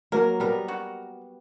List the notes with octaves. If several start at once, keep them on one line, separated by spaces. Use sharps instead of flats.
F#3 A#3 A#4
G3 B3 A#4
F#4